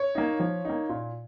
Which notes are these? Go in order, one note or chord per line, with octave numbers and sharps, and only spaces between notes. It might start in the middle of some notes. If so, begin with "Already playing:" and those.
Already playing: C#5
A#3 D#4
F3
A#3 D#4
A#2